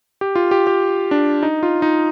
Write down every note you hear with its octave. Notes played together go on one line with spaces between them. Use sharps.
G4
F4
G4
G4
D4
D#4
F4
D#4